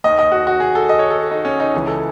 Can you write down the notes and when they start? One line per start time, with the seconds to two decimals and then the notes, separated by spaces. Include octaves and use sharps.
0.04 D#2 D#3 D#5
0.19 D#5
0.32 F#4
0.47 F#4
0.60 G#4
0.75 A4
0.89 D#5
0.99 C#5
1.10 A4
1.31 D#4
1.45 C#4
1.60 D#4
1.74 C#2 C#3 E3
1.87 A4